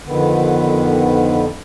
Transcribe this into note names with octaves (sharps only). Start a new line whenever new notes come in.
F2 D3 D#3 B3